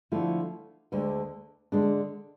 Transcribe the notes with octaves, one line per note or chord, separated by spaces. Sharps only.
D3 F3 A3 E4
D2 D3 G#3
D3 G#3 D4